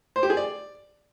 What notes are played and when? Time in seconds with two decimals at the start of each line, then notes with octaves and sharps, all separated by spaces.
0.16 C5
0.23 G4
0.30 G#4
0.37 D5